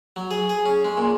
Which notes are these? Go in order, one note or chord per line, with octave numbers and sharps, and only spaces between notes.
F#3
G#4
G#4
C#4
G#3
A#2